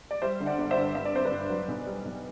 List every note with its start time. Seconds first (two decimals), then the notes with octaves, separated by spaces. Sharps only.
0.11 D5
0.22 G3 C5 E5
0.40 D3
0.46 D5 F#5
0.58 G1
0.71 C5 E5
0.77 G2
0.95 G2 E5
1.05 D5
1.13 C4 C5
1.25 B4 D5
1.32 G2
1.50 F#3
1.68 B1
1.87 G3
2.05 B1